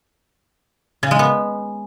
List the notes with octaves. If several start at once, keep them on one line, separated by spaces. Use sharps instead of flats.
C#3
G#3
B3